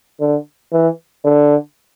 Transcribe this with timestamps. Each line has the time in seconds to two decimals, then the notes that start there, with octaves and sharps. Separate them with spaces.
0.20 D3
0.72 E3
1.24 D3